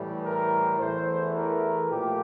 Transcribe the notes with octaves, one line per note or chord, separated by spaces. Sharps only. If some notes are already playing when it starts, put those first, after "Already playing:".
Already playing: A2 E3 G3
A#4
E2 E3 A3 C5
A#4
A#2 F3 A3 G4